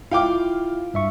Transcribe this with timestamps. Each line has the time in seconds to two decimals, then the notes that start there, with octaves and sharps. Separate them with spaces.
0.11 E4 F4 F5 G5 D6
0.94 G2 E5 C#6